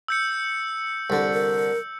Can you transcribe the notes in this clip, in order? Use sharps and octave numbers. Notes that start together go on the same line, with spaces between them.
E6 G6 C#7
C2 D3
A#4